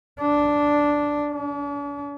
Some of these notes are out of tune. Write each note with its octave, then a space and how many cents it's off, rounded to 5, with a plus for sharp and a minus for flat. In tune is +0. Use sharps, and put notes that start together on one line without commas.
D4 -5
D4 -45